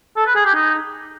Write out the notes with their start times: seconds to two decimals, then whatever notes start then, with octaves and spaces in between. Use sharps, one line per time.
0.16 A4
0.26 B4
0.35 G#4
0.45 G4
0.55 D#4